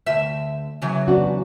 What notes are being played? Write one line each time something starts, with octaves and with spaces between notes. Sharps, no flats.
D2 E5
C#3 E3 F#3
B3 D4 F#4